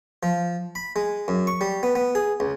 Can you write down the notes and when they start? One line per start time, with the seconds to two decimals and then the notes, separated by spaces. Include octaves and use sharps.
0.23 F3
0.75 B5
0.96 G#3
1.28 F#2
1.47 C#6
1.61 G3
1.83 B3
1.95 B3
2.15 G#4
2.40 C#2